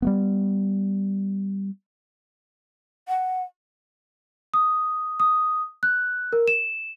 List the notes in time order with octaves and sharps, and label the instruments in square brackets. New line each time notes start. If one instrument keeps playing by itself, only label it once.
[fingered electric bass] G3 A3 B3
[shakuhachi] F#5
[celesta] D#6
D#6
F#6
A#4
E7